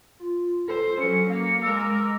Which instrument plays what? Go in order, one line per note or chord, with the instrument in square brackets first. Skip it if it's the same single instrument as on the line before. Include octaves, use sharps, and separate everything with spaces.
[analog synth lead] F4
[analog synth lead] A4 [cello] C5
[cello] F#3 C#4 [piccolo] C#7
[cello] A#3 [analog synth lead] F5
[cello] G#3 A#4 [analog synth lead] D6 [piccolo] E6